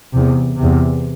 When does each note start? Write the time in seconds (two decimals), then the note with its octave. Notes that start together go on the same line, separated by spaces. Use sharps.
0.13 E2 C3
0.57 E2 C3